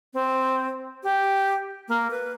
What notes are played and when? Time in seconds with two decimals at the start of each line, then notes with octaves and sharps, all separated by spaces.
0.14 C4
1.03 G4
1.89 A#3
2.11 B4